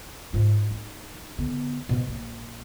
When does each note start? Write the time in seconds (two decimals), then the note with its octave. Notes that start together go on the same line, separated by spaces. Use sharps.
0.33 G#2 F4
0.71 D#4
1.38 D3 B3
1.89 B2 F3
2.08 A#1